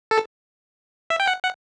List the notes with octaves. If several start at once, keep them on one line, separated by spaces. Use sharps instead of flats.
A4
E5
G5
F#5
F#5